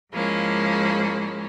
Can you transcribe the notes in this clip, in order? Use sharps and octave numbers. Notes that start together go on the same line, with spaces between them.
G#2 F3 G#3 A#3 C#4 E4